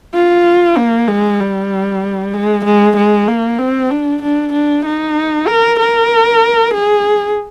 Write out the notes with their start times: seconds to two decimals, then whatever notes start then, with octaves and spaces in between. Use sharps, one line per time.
0.14 F4
0.77 A#3
1.08 G#3
1.39 G3
2.34 G#3
2.65 G#3
2.97 G#3
3.28 A#3
3.59 C4
3.90 D4
4.22 D4
4.53 D4
4.85 D#4
5.47 A#4
5.79 A#4
6.74 G#4